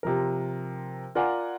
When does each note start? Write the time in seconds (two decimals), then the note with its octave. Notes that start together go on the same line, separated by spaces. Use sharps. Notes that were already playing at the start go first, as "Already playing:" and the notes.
0.03 C3 F3 A#4
1.15 F4 A#4 D5 F#5 G#5